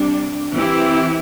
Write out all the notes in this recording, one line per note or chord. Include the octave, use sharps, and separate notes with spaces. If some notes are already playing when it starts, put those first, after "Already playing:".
Already playing: C3 G3 D4
E3 C4 E4 G4